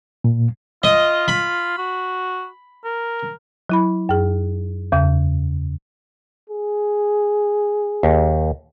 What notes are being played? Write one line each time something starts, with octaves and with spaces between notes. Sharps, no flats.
A#2
F4 D#5
B5
F#4
A#4
F#3 E4 B5
F#2 G#4
E2 C#3
G#4
D#2